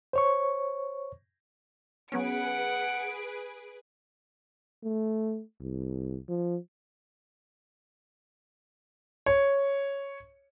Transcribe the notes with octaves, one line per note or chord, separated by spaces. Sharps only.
C5 C#5 C#6
F#3 B3 C#4 G#4 B4 F#5 D7
A3
C2
F3
C#5